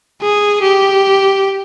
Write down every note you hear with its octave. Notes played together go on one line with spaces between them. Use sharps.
G#4
G4